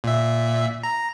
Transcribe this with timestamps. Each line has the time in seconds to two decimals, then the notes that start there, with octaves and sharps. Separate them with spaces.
0.04 A#2 E5
0.83 A#5